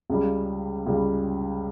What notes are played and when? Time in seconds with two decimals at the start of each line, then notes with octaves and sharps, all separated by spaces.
0.10 C#2 C#3 G3
0.86 C#2 C#3 G3